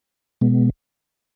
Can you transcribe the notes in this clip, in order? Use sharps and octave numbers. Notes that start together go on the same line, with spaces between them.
B2 G#3 B3